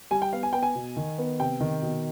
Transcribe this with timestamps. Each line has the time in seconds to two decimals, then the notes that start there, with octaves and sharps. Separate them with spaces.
0.11 G3 G#5
0.22 G5
0.33 B3 F5
0.43 G#5
0.53 B3 G5
0.63 G#5
0.75 B2
0.97 D#3
1.18 B3
1.40 C3 G5
1.60 D#3
1.82 B2